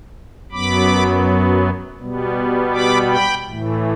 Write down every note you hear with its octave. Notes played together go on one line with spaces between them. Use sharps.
F#2 F#3 B3 B5 D6
B2 G3 B3
B5 D6
G5 B5
A2 E3 A3